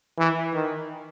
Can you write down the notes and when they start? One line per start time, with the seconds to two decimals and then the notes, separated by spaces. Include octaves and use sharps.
0.18 E3
0.54 D#3